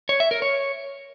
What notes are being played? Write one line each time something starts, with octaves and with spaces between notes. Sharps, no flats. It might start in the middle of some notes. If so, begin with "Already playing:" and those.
C#5
E5
A#4
C#5